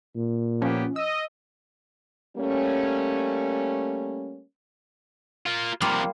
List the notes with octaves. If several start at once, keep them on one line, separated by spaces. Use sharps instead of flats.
A#2
F3 A#3 B3 C#4 G4
D#5 E6
G3 A3 A#3 C#4
A#3 F4
C3 F3 G3 A#3 F4